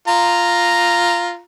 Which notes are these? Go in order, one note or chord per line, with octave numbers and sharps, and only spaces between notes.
F4 A#5